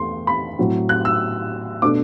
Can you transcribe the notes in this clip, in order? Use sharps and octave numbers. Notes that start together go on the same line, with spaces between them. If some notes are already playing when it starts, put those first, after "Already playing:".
Already playing: E2 A3 C6
B5
A2 F#3 C4
F#6
E6
B2 A3 D4 D6